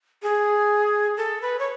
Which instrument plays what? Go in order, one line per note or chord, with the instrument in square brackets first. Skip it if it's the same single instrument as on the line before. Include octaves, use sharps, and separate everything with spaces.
[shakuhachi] G#4
A4
B4
C#5